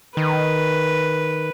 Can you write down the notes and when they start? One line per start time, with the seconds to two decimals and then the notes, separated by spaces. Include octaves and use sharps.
0.17 D#3 B4